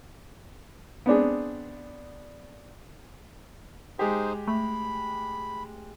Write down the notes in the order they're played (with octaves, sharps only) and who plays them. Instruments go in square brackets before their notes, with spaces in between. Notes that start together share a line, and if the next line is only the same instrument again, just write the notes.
[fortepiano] B3 C4 D4 G#4
[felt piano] G#3 G4 [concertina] D#4 G#4 C5
[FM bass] A3 [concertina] B5